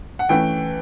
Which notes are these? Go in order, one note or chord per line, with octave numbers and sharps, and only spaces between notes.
F#5
E3 A3 C#4 G5